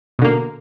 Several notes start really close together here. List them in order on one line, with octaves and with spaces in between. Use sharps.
B2 D3 A#3